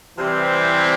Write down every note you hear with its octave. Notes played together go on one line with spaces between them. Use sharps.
C3 E3 G3 C4 E4